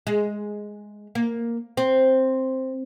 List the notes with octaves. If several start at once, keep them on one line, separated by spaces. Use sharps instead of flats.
G#3
A#3
C4